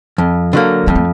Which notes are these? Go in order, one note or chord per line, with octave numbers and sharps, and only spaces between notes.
F2
D3 F#3 A#3
F2 G#3
A3